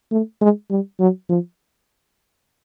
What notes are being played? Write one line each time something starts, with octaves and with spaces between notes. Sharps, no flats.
A3
G#3
G3
F#3
F3